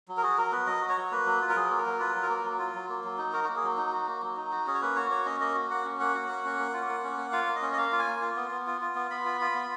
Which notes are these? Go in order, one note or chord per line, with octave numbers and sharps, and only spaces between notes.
F#3
A#4
F#4 G#4
F#3 A#4
B3 B4
F#3 D#5
F#4
C#5
F#3
A#3 B4
F#3
F4
A#4
F#3 G#4
A#3
A#4
F#3
F4 B4
F#3
A#4
A#3
F#3
F4
F#3
A#3
F#3
D#4
F#4 A#4
A#3 F#4
G#4
F#3
D#4
F#4
A#3
F#3
D#4
F#4
C#4 G#4
C#5
A#3 B4
F#4 C#5
A#3 C#5
C#4 D#5
A#3 D#5
F#4
A#3 F#5
C#4
A#3 F#5
F#4
A#3
C#4
A#3
F4
A#3
C#4
A#3
F4 F5
A#3
D#5
C#4
D#5
A#3 F5
F4
G#5
A#3
F4
B3
B3
F4
F4
B3
B3 B5
F4
F4
B3